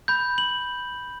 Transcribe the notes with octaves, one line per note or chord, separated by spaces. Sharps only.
B5 G6
F#7